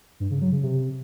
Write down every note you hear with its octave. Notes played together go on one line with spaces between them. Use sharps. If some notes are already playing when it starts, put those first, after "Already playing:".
G2
C#3
F#3
C#3
C3